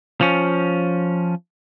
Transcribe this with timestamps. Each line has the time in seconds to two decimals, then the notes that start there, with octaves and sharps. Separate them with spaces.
0.21 F3 C#4